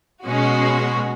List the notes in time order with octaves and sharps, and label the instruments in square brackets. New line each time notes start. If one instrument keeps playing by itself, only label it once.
[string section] B2 G#3 C#4 F#4